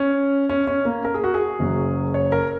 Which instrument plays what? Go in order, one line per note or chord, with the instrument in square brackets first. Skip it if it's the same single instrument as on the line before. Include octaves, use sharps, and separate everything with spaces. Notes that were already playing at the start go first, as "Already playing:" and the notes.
Already playing: [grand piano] C#4
C#4
C#4
A#3
A#4
G#4
F#4
G#4
F#1 F#2 F#3
C#5
A#4